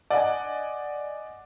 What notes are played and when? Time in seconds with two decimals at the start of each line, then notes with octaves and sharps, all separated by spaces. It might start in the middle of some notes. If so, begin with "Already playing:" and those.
0.10 D5 D#5 F#5 G#5